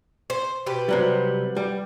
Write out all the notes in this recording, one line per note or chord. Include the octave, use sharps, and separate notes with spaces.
C5
B2 G4 B4
C3 F#3 G3
G3